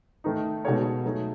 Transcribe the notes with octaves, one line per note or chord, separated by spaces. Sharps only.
D#3 A3 D#4
B2 G#3 D#4 A4 C#5
F#3 A3 D#4 G#4